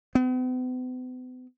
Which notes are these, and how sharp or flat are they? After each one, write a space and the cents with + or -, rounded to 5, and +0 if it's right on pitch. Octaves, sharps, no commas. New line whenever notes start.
B3 +45